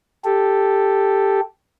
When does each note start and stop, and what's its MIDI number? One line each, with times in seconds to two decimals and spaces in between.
0.24 1.40 67
0.24 1.40 69